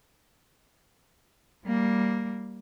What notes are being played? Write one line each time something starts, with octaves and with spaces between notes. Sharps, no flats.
G3 A#3